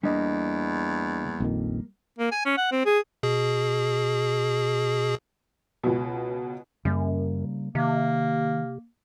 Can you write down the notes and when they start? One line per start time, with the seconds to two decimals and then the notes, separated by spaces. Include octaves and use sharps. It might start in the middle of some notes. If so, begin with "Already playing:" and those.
0.03 E2 G3 A#3 D4 D#5
1.40 A#1 F2 D#3
2.19 A#3
2.32 G#5
2.45 C#4
2.57 F#5
2.71 C4
2.85 G#4
3.23 B2 G#4
5.83 C#2 B2
6.85 F#2 C#3 G3 A#3
7.75 C3 D#3 A#3